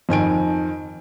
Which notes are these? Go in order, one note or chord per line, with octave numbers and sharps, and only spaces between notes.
F2 D#3 G#5 D7